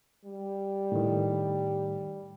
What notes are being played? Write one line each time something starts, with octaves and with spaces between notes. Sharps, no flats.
G3
A2 D#3